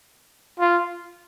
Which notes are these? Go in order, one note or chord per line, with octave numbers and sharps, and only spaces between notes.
F4